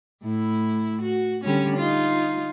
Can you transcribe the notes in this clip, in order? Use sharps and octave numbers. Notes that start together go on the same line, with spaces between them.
A2 E4
F#4
D3 G3 C#4
D#4 F4